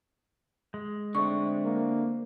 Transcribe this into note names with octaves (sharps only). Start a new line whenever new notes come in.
G#3
D3 A3 C4 C#6
A#3